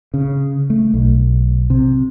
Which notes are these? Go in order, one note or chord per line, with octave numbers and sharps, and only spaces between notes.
C#3
A3
B1
C3